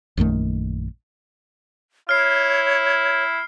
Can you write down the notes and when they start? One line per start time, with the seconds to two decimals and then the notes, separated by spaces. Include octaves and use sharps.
0.17 A#1 F#2 D#3 A3
2.09 E4 C#5 F6 C7